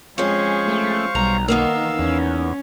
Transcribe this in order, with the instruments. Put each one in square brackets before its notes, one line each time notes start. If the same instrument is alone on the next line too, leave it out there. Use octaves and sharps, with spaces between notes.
[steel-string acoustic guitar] F2 C#4 [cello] G#3 G#4 [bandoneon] C5 F5 C#6
[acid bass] A3
[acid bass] B1 [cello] G3 [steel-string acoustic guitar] A#5
[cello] D#3 [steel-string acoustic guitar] A#3 B3 D#4 [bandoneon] F5 E6
[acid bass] E2 [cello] C#4